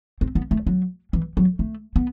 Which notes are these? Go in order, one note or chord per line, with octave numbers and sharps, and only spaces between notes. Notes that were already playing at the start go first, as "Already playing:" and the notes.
C4
B3
A3
F#3
E3
F#3
A3
B3